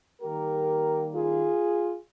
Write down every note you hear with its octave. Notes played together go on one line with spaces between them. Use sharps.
D#3 G3 A#3 G4 A#4
F4 G#4